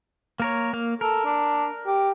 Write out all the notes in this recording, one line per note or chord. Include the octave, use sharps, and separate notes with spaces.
A#3 A#4 C#5
A#3 F5
A4 A#4
D4
G4